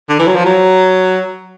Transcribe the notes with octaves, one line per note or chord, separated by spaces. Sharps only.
D3
E3
F#3
F3
F#3